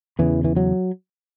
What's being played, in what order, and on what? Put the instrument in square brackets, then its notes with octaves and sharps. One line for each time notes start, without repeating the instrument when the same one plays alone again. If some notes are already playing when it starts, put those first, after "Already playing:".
[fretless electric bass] E2 C#3 E3
E3
F#3